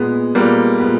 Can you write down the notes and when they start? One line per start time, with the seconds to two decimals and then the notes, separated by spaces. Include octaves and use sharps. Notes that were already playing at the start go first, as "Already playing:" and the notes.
Already playing: A#2 G#3 B3
0.35 A#2 G3 G#3 A#3 B3
0.80 A#2 G#3 B3